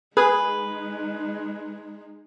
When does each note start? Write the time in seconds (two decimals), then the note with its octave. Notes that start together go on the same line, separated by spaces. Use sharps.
0.17 G#3 D#4 G#4 B4